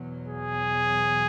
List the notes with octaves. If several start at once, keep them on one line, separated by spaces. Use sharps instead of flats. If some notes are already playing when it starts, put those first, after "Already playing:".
Already playing: E2 B2 F#3
G#4